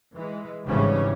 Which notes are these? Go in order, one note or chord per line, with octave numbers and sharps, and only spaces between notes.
E3 G#3
G#1 C#3 E3 G3 C#4